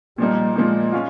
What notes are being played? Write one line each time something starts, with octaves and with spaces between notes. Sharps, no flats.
A#2 F3 G3 A#3 D#4
A#2 F3 G#3 A#3 D#4
G#3 C#4 F4